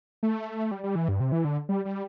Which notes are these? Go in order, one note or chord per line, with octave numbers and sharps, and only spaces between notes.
A3
G3
G3
E3
G2
C3
E3
D3
G3
G3